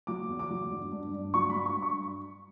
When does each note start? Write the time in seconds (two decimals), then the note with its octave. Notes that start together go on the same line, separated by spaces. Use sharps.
0.07 F#3 D6
0.29 E2
0.39 D6
0.50 F#3
0.71 G2
0.92 G2
1.14 G2
1.34 F#3 C#6
1.50 B5
1.55 G2
1.66 C#6
1.76 G2
1.82 C#6